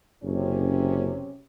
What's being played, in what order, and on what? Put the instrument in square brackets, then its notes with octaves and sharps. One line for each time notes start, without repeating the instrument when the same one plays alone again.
[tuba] F#1 [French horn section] C3 C#4